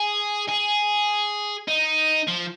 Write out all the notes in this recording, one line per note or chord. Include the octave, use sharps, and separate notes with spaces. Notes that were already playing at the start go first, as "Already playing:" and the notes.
Already playing: G#4
G#4
D#4
F3